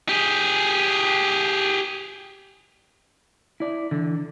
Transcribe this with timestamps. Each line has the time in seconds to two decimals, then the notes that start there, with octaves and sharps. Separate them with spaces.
0.09 G4 G#4
3.60 E4 D5
3.91 D3 E3